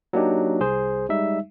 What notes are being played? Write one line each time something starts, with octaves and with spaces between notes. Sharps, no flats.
F#3 A#3 D4 D#4 G4
C2 G#4 C5
G3 G#3 D#4 E5